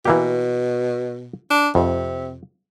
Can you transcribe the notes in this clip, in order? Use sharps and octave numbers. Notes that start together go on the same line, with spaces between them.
B2 E3 A#3 G4
D4
F2 C3